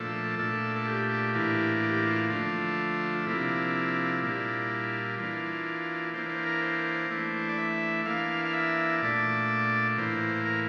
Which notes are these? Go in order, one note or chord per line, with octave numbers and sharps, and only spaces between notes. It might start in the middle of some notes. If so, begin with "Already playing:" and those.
Already playing: A#2 F3 A3 D4 A4
A#2 A3 D4
A4
G4
A2 E3 A#3 D4
G4
F4
D3 F3 A3 D4
C3 F3 A#3 D4 E4
A#2 G3 A#3 D4
E3 A#3 D4 F4
E3 A#3 D4 C5
C5
A#4
C5
E3 A3 D4
D5
E5
E3 A#3 D4 F5
F5
E5
A#2 A3 D4 D5
A2 E3 A#3 C5
A#4